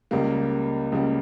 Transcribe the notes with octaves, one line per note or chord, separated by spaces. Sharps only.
C#2 C#3 G3 A#3
C#2 C#3 G3 A#3